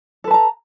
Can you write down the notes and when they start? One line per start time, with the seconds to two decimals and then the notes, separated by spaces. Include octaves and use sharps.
0.24 A4
0.27 B4
0.31 A5
0.34 A#5